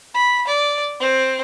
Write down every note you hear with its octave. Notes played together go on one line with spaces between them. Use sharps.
B5
D5
C4